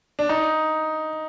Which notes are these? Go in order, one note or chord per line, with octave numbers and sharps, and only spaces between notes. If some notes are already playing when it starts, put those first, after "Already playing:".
D4
D#4